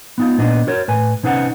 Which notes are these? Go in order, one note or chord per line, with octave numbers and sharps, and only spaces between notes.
B3 D#4 F4
A#2 B3 D4 D#5
F#4 A#4 C#5
A2 B4 G#5
C3 C#4 D#4 B4 F5 F#5